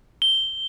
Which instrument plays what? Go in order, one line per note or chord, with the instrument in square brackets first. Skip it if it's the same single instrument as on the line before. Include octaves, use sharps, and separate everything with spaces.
[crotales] G7